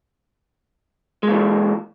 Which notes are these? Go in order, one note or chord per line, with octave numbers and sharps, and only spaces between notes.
E3 G#3 A#3